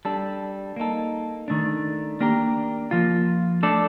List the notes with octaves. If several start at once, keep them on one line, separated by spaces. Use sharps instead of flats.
G3 D4 A4
A#3 D#4 A4
D#3 A3 D4
A#3 D4 G4 A#4
F3 A#3 F4
A3 D4 A4 D5